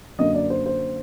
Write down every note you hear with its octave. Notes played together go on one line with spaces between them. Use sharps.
F#2 D3 F#3 A#3 D#5
D5
C5
C5